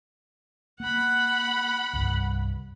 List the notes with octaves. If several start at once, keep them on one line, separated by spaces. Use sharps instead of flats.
A#3 F#5 B5
C2 G2